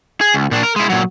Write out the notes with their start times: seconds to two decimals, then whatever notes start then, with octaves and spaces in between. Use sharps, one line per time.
0.21 G#4
0.34 C#2
0.51 A#2 D4
0.63 A#4
0.76 G#3 E4
0.90 A#2 F#3